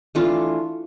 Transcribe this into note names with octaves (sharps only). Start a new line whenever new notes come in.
E3 A3 D4 F4